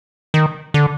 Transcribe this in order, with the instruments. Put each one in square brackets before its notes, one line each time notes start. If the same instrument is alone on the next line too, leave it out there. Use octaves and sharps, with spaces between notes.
[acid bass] D#3
D3